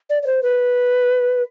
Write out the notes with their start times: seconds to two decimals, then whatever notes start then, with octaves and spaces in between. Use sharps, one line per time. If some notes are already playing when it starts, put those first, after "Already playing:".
0.10 D5
0.23 D5
0.27 C5
0.43 B4